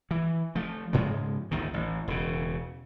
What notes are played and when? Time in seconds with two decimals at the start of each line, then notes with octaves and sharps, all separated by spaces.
0.11 E3
0.55 F3 A3
0.93 G#2 C#3 F3 G#3
1.51 G1 D#2 A2 D#3
1.74 A1
2.08 E1 C#3